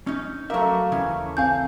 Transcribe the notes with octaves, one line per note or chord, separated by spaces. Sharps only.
C#4 D#4
F#3 A3 A#3 E5
D#2 C#3 E3 C#4 D6 D#6
A1 C4 F5 G#5 E6 G6